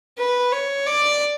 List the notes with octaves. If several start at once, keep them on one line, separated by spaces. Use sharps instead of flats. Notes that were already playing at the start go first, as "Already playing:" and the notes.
B4
C#5
D5